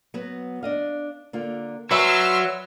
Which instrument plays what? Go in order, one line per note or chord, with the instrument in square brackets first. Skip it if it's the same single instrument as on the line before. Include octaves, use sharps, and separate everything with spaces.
[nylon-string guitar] F#3 B3 F#4
D4 D#5 F5
D3 A#3 F4
[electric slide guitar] F#3 [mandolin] B4 E5 G#5 [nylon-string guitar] D5 [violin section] C6 E6 F6